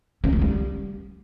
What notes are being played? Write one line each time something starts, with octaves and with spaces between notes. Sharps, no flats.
C#4
D#4
G3